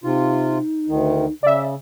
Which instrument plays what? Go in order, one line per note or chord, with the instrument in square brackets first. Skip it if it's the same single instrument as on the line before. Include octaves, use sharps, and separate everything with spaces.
[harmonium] C3 F4 [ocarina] D#4
[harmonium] D2 D#3
[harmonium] C#3 [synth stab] D5 E5